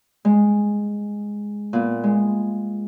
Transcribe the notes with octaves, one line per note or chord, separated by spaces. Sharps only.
G#3
A#2 B3
G#3